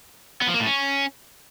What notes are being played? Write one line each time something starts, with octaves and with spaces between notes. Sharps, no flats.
B3
F3
A#3
A2
C#4